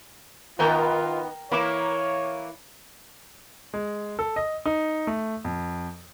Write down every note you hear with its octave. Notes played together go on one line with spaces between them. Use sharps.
D#3 B3 F4 A#4 G5 G#5
E3 A#3 E4 C#5 B5 D6
G#3
A4
D#5
D#4
A3
F2